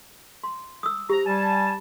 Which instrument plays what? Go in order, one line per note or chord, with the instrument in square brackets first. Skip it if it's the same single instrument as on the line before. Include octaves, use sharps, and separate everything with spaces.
[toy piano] C6
D#6 E6
[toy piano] G4 C5 [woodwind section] A#5
[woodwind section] G3 G#5 A5